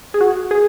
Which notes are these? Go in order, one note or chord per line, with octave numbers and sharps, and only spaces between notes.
G#4
F#4
G#4